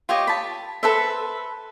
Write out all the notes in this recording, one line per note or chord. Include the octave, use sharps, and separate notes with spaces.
F4 G4 C#5 D#5
A5 B5
A4 B4 C5 E5